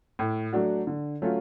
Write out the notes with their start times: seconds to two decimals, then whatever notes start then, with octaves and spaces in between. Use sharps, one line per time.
0.19 A2
0.53 F#3 A3 D4 F#4
0.87 D3
1.22 F#3 A3 C#4 F4